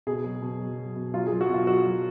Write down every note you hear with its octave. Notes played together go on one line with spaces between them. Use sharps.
B2 G#4
F#3
B2
F#3
F#3
B2
F#3 F4
F#3 G#4
F#4
B2 F4
F#3 F#4
F#3